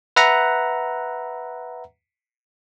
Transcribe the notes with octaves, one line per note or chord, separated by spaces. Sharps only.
B4 E5 F#5 A#5